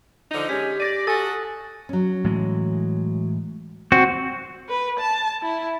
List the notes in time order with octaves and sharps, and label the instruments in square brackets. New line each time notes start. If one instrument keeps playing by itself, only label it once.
[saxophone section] D3 F3 D#4
[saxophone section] D3 G#3 C#4 [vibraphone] G4 [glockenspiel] B6
[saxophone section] D5 [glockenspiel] A6 A#6 D#7
[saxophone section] F#4 A4 [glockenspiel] G#5 D#6 A6
[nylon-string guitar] F#3 C#4
[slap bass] A2 E3 G#3
[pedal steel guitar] C4 F#4
[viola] B4
A5
E4